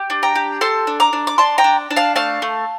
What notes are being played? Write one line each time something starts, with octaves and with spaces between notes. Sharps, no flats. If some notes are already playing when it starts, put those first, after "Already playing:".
Already playing: G4
D4
G5 A#5
G4
A4 A5 C6
D4
A#5 D6
D4
D6
D4 A5 C6
G5 A#5
D4
D4
F5 A5
A3 F5 A5
A3